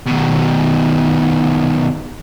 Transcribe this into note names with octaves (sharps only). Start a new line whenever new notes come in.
B2 D#3